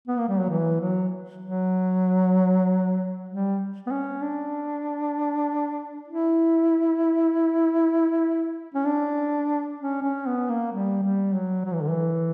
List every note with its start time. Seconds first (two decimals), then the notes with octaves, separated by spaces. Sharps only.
0.08 B3
0.19 A#3
0.29 G3
0.40 F#3
0.50 E3
0.81 F#3
1.43 F#3
3.29 G3
3.87 B3
3.91 C#4
4.22 D4
6.08 E4
8.74 C#4
8.86 D4
9.80 C#4
10.03 C#4
10.26 B3
10.49 A#3
10.73 G3
11.04 G3
11.34 F#3
11.65 F#3
11.74 E3
11.82 D3
11.90 E3